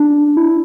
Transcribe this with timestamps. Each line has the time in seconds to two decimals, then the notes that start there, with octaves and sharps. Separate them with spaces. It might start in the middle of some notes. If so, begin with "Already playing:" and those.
Already playing: D4
0.37 E4